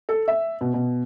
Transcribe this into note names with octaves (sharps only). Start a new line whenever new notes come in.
A4
E5
B2
B2